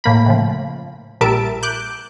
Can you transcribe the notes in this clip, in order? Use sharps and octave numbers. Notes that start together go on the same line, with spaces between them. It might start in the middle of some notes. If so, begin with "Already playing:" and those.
A2 A#3 B5
A2 C#3 F3
A#1 G3 A#4 E5 A5 D7
D6 F#6 G6